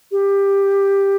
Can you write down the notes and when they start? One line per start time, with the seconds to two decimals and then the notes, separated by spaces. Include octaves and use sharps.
0.11 G4